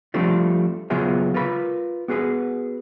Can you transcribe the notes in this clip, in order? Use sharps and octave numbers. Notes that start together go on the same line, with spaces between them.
F3 G3 A3 C4 D4 F4
C#3 F#3 B3 F4 G#4 E5
F4 A#4 B4 B5
B3 F#4 G#4 B4